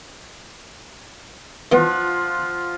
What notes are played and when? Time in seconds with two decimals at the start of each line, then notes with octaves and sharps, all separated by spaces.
1.72 E3 F3 B3 F4 F#5